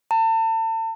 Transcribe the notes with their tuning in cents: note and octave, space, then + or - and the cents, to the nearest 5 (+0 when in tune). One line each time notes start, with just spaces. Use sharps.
A5 +40